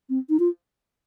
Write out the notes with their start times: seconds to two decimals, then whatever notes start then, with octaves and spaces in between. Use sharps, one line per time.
0.10 C4
0.29 D#4
0.40 F4